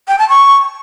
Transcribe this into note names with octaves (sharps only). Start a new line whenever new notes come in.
G5
A5
C#6